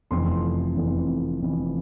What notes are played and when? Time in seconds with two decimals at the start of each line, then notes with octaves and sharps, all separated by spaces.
0.11 F1 F2 E3 C6
0.75 F1 F2 E3
1.41 F1 F2 E3